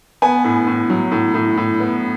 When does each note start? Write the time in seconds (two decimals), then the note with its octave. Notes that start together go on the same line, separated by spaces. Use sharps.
0.22 B3 G#5
0.44 A2
0.67 A2
0.90 F#3
1.12 A2
1.34 A2
1.57 A2
1.80 B3